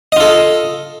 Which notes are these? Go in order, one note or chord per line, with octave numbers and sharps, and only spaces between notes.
F4 A4 D#5